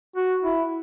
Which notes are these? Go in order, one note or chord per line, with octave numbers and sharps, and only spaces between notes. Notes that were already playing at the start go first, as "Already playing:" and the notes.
F#4
E4